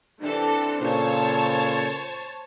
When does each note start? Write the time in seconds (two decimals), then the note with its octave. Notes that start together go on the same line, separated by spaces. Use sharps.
0.21 C3 E3 D4 A4
0.80 A#2 C#3 A4 C5 C#5 A5